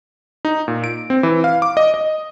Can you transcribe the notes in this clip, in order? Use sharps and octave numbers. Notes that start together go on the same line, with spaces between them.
D#4
A#2
D7
C4
E3
F5
D6
D#5
D#5